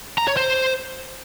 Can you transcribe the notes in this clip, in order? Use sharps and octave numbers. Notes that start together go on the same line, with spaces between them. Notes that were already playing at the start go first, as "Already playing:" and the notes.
A#5
C#5
C5